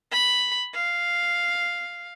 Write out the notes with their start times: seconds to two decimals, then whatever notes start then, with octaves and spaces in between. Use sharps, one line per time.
0.12 B5
0.74 F5